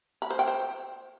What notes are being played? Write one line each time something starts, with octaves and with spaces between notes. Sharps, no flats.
B5
C5
G5
C5